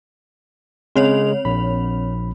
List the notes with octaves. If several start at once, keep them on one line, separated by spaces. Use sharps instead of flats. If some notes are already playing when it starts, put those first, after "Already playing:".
C#3 G#3 C4 C#5 F7
A#1 B5